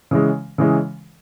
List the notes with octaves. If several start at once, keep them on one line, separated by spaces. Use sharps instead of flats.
C#3 E3 G#3
C#3 E3 G#3